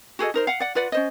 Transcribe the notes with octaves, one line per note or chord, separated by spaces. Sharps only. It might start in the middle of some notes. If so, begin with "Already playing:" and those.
F#4 G#4 A4 D#5
D#4 A#4 C5
F5 F#5
D5 F#5
F4 B4 D5 F#5
C#4 C5 D#5